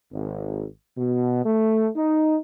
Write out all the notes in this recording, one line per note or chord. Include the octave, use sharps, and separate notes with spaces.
G#1
B2
A3
D#4